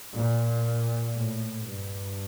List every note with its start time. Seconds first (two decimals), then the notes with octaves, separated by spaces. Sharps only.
0.15 A#2
1.16 A2
1.67 G2